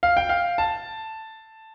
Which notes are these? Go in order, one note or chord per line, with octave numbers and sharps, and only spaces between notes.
F5
G5
F5
A5